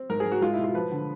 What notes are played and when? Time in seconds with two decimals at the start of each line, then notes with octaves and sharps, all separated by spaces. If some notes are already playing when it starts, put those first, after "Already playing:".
Already playing: C4
0.10 G#2 A#4
0.20 G#4
0.26 G#2
0.32 F#4
0.41 G#3 F4
0.53 E4
0.59 B2
0.64 F4
0.74 F3 B4
0.92 D3